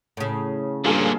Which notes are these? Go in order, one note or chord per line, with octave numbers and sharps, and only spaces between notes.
A2 C#3
G2 A#2 D3 F4 G#4 A4